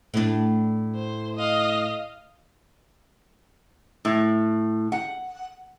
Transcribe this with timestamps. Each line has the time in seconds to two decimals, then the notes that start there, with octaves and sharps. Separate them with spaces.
0.14 A2 D4
0.95 C5
1.37 D#5 F5
4.05 A2
4.92 F#5